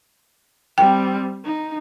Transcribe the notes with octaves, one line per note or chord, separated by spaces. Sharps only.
G3 C4 G5
D#4